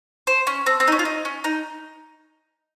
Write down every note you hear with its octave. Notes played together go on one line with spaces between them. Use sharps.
C5
C#4
C4
C4
D#4
C#4
F4
D#4
C#4
D#4